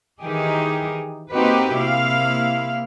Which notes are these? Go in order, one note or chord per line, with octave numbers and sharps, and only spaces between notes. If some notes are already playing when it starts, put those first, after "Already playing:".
D#3 E3 D#4 G4 G#4
A#3 C4 D#4 F#4 G4 B4
C3 A#3 E4 F5